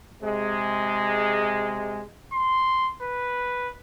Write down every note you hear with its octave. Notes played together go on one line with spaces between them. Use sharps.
C3 G#3
C6
B4